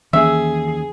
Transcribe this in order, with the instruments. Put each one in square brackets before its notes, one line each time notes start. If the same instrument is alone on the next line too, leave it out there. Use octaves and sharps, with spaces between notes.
[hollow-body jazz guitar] D#2 [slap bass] E3 C#4 [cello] G#4 [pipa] E5